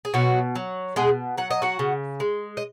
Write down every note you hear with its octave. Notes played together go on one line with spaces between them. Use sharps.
G#4
B2 F#3 F#4
F#3
B2 G#3 G#4
F#3 F#5
D#5
F#4 F#5
C#3
G#3
D#5